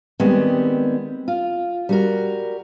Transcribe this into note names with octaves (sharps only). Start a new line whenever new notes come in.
D#3 G3 G#3 B3 C4
F4
G3 F#4 A#4